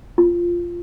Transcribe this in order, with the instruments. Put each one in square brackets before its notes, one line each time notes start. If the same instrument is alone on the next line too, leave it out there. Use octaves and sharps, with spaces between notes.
[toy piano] F4